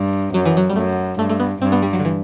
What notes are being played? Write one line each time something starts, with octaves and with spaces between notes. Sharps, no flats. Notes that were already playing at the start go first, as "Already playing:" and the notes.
Already playing: G2
F#2 F#3
E3
F#3
G3
F#2 A3
G2 A3
A3
B3
G2 C4
B3
G3
F#3
D3
E3